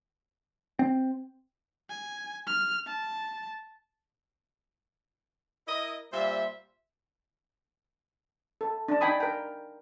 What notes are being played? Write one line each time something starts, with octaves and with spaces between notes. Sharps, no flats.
C4
G#5
F6
A5
E4 A#4 D#5
A#2 G3 C5 E5
A4
D4 A5
D4 D#4 G5 G#5 B5 D#6
A#4 G5